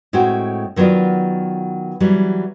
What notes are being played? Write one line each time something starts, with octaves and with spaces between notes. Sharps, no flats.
A2 G#3 C4 F#4 C#5 G5
D#3 F#3 B3 F4 D5
E3 F#3 G3